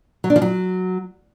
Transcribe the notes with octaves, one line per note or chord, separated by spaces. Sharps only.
F#3
D4
F3
F#3